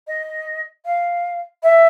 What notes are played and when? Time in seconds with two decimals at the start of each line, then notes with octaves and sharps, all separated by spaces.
0.07 D#5
0.85 F5
1.63 E5